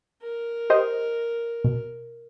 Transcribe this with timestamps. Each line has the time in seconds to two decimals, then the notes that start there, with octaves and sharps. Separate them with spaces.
0.22 A#4
0.70 G4 C5 D#5
1.64 B2